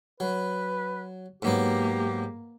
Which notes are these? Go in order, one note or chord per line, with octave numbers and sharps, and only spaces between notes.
F#3 B4
G#2 F#3 A#3 B3 G4